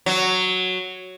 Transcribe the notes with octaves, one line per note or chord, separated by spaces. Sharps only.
F#3